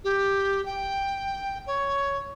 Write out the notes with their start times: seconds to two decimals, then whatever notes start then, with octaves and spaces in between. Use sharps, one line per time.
0.04 G4
0.66 G5
1.67 C#5